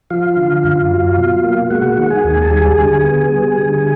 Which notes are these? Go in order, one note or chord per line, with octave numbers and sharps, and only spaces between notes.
F3 F4 F5
D3
F#2
F#3
B2
A#3
G#3 F#4 F#5
D#3
G#4 G#5
D#2
A5
G3 G#4 G#5
D3
B3
G3
D3